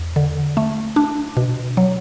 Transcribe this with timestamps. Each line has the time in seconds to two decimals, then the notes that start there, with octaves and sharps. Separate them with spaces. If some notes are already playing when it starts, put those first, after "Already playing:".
Already playing: E2
0.16 D3
0.57 A3
0.96 D4
1.37 B2
1.77 F#3